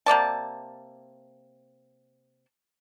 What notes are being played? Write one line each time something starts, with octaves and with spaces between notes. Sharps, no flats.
C3 A#3 D5 A5